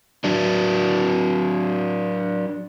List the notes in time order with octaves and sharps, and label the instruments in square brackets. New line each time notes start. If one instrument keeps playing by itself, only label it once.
[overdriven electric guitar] F#3 D4